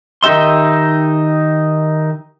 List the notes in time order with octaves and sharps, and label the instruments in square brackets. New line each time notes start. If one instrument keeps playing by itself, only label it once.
[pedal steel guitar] D#3 D#4 G4 E5 C6